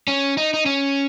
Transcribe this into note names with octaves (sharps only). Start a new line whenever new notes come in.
C#4
D#4
D#4
C#4